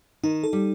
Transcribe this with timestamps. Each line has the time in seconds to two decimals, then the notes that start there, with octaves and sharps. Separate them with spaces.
0.23 D#3 D#4
0.43 A4
0.53 G3